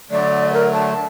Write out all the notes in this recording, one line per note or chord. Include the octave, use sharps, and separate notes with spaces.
D3 F#3 A3 D5
A#4
A5